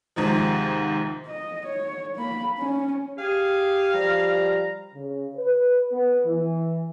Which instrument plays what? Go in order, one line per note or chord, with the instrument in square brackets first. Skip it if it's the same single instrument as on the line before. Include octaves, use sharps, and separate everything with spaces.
[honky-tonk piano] D#2 G#2 C3 F3
[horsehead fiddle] D#5
C#5
A#3 B5
C#4
[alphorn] G4 [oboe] G#4 [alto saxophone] F5
[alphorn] F3 [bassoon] G3 [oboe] A#5
[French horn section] C#3
B4
B3
E3